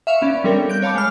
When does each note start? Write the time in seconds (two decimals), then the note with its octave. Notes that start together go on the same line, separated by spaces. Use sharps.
0.07 E5 F5 C#6
0.22 B3 C#4 D5
0.44 G3 C4 D4 A4 A#4 C#5
0.69 F#6 G6 D7
0.82 C#5 F5 A5 B5 D6
0.95 G#3 F6